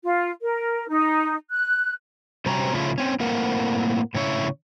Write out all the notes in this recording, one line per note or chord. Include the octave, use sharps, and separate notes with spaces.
F4
A#4
D#4
F#6
C3 G3 C4 C#4 F#4 A#5
A2 C#3 F3 A3 E4 F4
C4 C#4
A2 A#3 C4 A#4 F#5
A2 C#3 E4 C#5